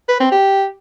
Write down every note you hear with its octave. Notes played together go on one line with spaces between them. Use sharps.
B4
C4
G4